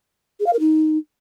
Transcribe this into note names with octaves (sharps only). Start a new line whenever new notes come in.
G#4
F5
A#4
D#4